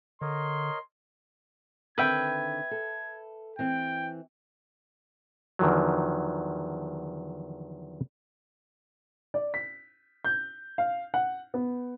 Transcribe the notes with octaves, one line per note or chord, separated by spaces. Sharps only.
D3 A#4 C#5 D#5 C6
D3 D#3 C4 B4 E5 G5 G#6
A4
E3 C4 G5
E2 D3 D#3 F3 F#3
D5
B6
G6
F5
F#5
B3